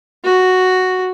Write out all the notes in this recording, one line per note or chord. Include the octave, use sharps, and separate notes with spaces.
F#4